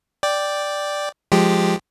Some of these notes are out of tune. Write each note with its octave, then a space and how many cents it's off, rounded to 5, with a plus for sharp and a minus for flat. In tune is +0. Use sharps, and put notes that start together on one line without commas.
D5 +0 G5 +0
F3 +10 G#3 +0 G4 +0